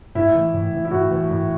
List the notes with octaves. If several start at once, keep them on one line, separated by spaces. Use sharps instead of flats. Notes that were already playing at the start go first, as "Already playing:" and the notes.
A2 E4
E3
A2
E3
E4
A2 F#4
E3
A2